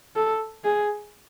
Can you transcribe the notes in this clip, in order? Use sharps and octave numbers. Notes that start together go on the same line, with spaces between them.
A4
G#4